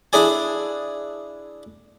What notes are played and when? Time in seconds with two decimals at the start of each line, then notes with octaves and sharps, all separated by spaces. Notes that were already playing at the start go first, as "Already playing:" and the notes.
0.13 D4 E4 G#4 D5 G#5